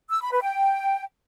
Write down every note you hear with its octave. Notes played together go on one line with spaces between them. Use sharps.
E6
B5
B4
G5